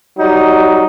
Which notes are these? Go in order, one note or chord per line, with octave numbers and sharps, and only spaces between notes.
F#3 G3 D#4